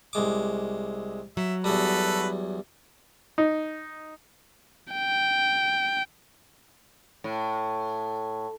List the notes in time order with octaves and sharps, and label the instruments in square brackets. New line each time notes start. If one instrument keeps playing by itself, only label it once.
[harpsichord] C2 G#3 D6
[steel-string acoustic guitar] F#3 [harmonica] E5
[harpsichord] E2 G3 [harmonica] F#4 A4 B4
[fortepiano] D#4
[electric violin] G5
[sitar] A2